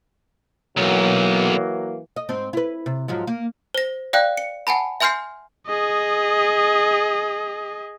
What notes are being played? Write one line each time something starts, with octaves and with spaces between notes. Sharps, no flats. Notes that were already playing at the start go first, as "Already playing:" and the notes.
B1 E3 F#3 A#3
D#5
G#2 C4
E4 B4
C3
G#2 F3 F#3
A#3
C5 A#6
D5 F5 G5 F#6
C#7
F#5 G#5 A5 B5
E5 G#5 C6 F6 G6 C7
G#4 D#5